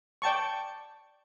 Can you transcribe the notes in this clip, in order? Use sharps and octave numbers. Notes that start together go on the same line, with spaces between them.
D5 G5 A5 C#6